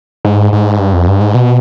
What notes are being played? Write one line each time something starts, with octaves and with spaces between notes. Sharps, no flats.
G#2
G#2
G2
F2
G2
G#2
B2